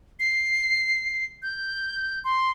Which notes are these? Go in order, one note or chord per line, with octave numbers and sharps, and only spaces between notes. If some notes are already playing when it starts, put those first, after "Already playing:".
C7
G6
C6